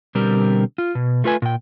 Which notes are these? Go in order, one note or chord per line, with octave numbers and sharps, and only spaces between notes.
B2 D3 G3 C4 G4 A#4
F4
B2
A3 F4 B4 G#5
A#2 G5